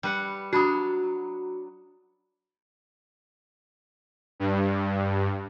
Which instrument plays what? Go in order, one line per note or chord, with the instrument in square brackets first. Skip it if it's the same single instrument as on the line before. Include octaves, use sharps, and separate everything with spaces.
[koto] G3 B4 F#5
[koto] F#3 D4 [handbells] F#4 B5 D#6
[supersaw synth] G2